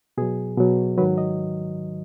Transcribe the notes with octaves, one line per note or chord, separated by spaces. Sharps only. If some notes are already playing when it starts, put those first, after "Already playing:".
B2 F#3 G#4
B2 F#3
G#2 D#3 F#3 B4
D#5